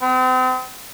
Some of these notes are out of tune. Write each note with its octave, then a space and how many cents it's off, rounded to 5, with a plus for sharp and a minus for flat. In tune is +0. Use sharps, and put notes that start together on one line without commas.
C4 -40